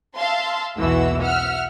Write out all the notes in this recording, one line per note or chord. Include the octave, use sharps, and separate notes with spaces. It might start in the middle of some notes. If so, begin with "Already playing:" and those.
E5 F5 A5 C6
B1 E2 B2 E3 F#4 E6
E5 F#5 F6